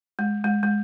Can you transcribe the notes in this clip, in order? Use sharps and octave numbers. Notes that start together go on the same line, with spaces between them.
G#3
G#3
G#3